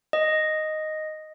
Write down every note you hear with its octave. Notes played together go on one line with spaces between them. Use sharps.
D#5